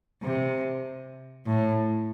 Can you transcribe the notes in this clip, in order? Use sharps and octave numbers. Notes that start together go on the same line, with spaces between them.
C3
A2